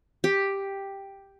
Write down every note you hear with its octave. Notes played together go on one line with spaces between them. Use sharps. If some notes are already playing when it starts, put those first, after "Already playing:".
G4